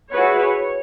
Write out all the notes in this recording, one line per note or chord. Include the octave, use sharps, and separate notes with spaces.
E4 F#4 G#4 B4 C#5
C#5